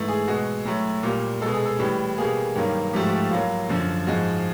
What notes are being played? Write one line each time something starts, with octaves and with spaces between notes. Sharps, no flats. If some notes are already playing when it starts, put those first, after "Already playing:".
Already playing: G#2 E3 A3
G#4
B2 G#3 F#4
A2 F#3 A3
A#2 G3 A#3
B2 G#3 A4
G#4
A4
A2 E3 G3
B2 G3 A#3 G#4
G2 D#3 F#3 A#3
G#2 F3 A3 G4
F#4
G4
A2 F#3 A#3 F4
F#2 D3 F3
G#2 F3 G#3 F#4